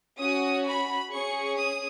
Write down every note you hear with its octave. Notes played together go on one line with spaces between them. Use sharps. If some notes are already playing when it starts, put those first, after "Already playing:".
C#4 F#4 D#6
B5
C#4 G#4 C#6
D#6